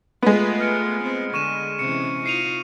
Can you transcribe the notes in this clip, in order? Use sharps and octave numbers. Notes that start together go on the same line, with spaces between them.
G#3 A3 B3 F4
F6 C#7 D7
C4
D3 C#6 D#7 E7
C3 E3 C#4 C#7
D#4 F4 C7 D#7 F7